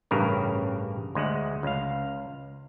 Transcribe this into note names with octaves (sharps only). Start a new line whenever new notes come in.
A1 G2 C#3 A#4
D2 G#3 F#5
C#2 F5